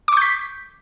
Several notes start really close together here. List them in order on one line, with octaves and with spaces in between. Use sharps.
D6 C#6 G6 B6